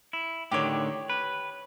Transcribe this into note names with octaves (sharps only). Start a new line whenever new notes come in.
E4
A2 D3 D#3 G4 C#5
B4